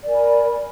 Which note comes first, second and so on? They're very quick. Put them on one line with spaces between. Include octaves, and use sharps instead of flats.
D5 A#4 G#5 B5